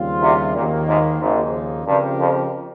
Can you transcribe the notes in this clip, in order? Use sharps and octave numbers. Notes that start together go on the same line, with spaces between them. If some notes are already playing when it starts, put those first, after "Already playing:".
Already playing: D#2 C#3 G3 C4 F4
C2 C3
A#1 D#2 A#2 D#3 A#3
G#1 G#2
G#1 D#2 G#2 C#3 F3 A#3 D#4
G2 C#3 F3 C4 G4 A#4
F2